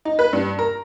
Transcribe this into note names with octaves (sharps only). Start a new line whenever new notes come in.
D#4
B4
G2
A#4